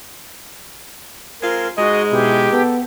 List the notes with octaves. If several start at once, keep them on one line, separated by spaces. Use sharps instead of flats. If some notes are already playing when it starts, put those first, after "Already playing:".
G#3 C4 F4 A#4
G#2 G#3 F#4 D#5
B2 E4 G4
B3 A4